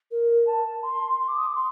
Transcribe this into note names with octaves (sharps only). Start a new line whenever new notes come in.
A#4
A5
C6
C6
D6
D#6
D6
C6